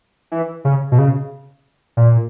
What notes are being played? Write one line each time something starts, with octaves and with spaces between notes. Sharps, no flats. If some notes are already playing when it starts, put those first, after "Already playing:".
E3
C#3
B2
C#3
A#2